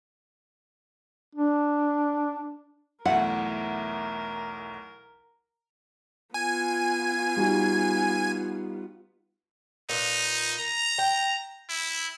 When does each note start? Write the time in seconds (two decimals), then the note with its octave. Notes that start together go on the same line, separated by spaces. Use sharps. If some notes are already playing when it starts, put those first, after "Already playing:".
1.35 D4
3.05 B1 E2 A3 E4 A#4 F#5
6.34 B3 F4 G#5
7.37 G3 D#4 F#4
9.89 A#2 D#4 B4
10.59 A#5
10.98 G5
11.69 E4